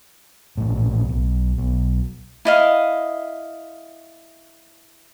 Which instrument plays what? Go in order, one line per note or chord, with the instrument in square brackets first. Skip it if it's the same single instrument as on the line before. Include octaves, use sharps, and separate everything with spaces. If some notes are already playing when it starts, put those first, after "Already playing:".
[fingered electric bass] A#1 A2
B1
B1
[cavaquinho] E4 D#5 F5